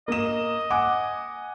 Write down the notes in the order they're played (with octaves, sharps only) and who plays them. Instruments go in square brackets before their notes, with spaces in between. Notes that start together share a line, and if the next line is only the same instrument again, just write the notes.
[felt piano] A#3 E7 [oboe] D#5
[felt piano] F#5 G#5 D6